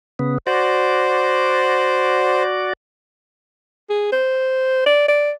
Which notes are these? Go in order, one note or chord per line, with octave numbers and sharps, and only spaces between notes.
C#3 B3
F#4 C5 D5
G#4
C5
D5
D5